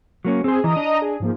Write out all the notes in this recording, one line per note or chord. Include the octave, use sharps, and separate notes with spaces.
F#3 A#3 C#4
C4 G#4 C5
E3 D#5 A#5 D#6
D4
G#4
G#2 F3 A#3